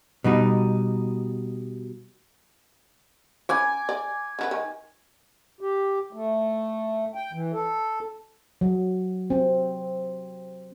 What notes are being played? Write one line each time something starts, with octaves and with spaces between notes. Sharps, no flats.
B2 G3 D#4
C#4 G#5 B5 D6
D5
D3 E4 B4
D#3
G4
A3
G5
E3
A4
F#3
C4